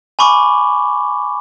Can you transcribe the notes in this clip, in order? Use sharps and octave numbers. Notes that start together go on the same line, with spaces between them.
G#5 B5 C#6 D6